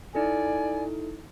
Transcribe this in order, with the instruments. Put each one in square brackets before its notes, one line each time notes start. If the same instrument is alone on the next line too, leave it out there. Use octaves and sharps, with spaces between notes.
[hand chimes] D#4 E4 A4 [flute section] D5 G#5